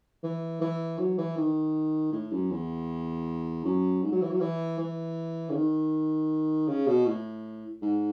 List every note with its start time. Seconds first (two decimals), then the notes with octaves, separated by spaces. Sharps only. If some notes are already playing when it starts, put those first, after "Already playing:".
0.23 E3
0.61 E3
0.99 F#3
1.18 E3
1.37 D#3
2.12 A2
2.32 F#2
2.51 E2
3.65 F#2
4.02 G#2
4.12 F#3
4.22 E3
4.31 F#3
4.40 E3
4.79 E3
5.50 C#3
5.54 D#3
6.68 C#3
6.87 B2
7.06 A2
7.82 G#2